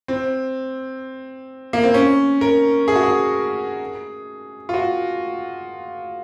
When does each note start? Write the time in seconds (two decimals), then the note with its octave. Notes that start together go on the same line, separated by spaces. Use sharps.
0.08 C4
1.73 A#3
1.84 C4
1.94 C#4
2.41 A#4
2.88 G#4
2.95 F#4
3.03 G#4
4.69 F4
4.74 F#4